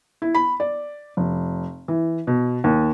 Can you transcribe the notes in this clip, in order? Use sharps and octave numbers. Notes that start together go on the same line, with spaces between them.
E4
B5
D5
F1
E3
B2
D#2